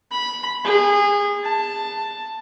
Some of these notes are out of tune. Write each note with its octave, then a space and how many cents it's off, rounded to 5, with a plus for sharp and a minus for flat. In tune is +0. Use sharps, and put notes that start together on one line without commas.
B5 -10
G#4 -25
A5 +10